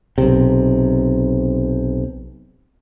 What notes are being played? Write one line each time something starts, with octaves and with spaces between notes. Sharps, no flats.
B1 C3